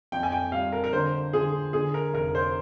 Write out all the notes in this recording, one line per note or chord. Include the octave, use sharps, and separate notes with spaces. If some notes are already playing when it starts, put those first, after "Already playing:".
F2 G5
G#5
G5
G3 F5
A#4
A#4
D3 C5
D3 G#4
D3 G#4
A#4
F1 A#4
C5